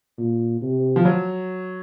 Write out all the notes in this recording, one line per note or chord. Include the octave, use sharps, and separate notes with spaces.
A#2
C3
F3
F#3